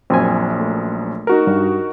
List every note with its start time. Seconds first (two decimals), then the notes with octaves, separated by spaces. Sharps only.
0.10 A#1 F#2 C4 G#5
0.60 A3
1.27 D#4 F#4 A#4
1.47 G2